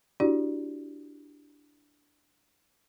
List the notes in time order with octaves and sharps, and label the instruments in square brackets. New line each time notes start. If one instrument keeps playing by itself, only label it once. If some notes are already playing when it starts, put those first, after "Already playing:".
[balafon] D4 E4 F#4 G4 D5